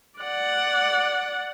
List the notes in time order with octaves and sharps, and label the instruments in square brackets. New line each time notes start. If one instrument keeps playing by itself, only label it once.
[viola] D5 F#5